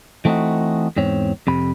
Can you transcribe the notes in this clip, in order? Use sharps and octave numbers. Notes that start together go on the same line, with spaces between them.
E3 A3 C4 D4 D#4 F#4
E2 G#2 C4 C#5
F2 C3 B5